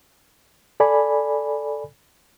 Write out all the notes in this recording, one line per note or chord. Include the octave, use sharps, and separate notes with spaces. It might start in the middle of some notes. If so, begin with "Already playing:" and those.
A4 D5 G#5 B5